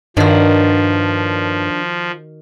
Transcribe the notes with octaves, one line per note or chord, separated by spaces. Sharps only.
G2 D#3 F3 D4 F#4 C#5